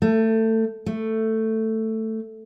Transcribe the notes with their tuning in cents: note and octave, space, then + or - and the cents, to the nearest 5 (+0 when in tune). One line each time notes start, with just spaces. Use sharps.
A3 +20
A3 +10